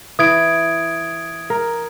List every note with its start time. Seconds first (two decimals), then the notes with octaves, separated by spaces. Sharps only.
0.19 E3 D#6 G#6 D7
1.50 A#4